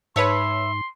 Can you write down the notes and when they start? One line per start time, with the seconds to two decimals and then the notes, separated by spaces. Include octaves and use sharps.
0.16 G#2 B4 C#5 E5 A5 B5 C6